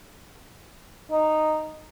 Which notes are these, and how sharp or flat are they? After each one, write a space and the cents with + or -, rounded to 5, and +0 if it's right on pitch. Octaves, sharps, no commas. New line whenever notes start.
D#4 -10